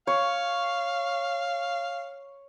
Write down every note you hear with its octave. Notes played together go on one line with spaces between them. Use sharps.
C#5 F5